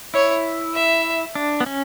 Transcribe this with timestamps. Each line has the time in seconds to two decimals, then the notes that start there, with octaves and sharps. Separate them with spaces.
0.14 E4 C#5
0.75 E5
1.35 D4
1.60 B3
1.66 C#4